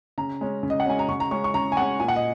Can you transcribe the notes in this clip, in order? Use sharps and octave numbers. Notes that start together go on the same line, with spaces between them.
C#3 A#5
G#3 C#4
C#3
D#5
F#5
G#3 C#4 G#5
A#5
C#3 C#6
A#5
G#3 C#4 C#6
C#6
C#3 A#5
G#5
G#3 C#4 F#5
A#2 G#5
F#5
D#5